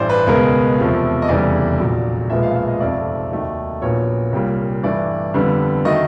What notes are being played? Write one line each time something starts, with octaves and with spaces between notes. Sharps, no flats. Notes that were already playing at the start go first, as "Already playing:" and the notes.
Already playing: A1 G2 E3 C5 D5
B4
C#2 B2 G#3 B3 A#4
E2 C3 F3 A3
D#5
F1 E2 C#3 E3 G3 D5
A#1 A#2 F#3
B1 A#2 F3 G#3 B3 E5
F5
E5
D#5
F1 F2 C3 F3 A3 D5
D#2 D#3 F#3 A3
A#1 A#2 F#3 B3 C#5
C2 A#2 G3 A#3
G2 E3 A3 D5
F2 D3 G3 B3
D#3 F#3 A3 D#5